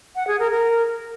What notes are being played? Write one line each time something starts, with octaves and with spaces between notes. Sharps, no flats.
F#5
G#4
A#4
A#4